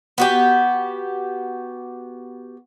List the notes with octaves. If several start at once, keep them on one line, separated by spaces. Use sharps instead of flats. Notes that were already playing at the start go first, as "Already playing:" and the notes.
B3 F#4 G4